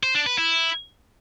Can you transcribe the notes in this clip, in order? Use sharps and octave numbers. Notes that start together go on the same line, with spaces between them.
C5
D4
B4
E4